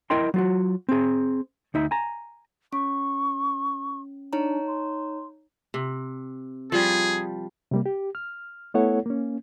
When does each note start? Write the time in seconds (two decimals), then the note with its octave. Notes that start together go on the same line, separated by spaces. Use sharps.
0.10 E4 A#4 D#5 G5 C6
0.34 F#3 F4 F#4
0.89 C4 G#4
1.74 D2 D#4 E5
1.91 G#5 A#5
2.73 C#4 C#6
4.33 D4 D#4 C#5 A#5
4.67 C6
5.74 C3
6.72 F3 G3 G#4
7.71 C3 G3 A#3
7.86 G4
8.15 F6
8.74 A3 B3 E4 A4 C#5 F#5
9.06 A#3 C#4